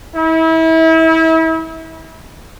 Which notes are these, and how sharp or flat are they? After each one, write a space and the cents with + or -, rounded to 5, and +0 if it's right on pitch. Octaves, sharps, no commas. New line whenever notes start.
E4 -30